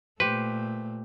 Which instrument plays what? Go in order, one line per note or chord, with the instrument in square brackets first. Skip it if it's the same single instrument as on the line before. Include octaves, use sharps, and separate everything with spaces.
[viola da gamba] A#2 A3 [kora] G4 C5 [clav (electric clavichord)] B4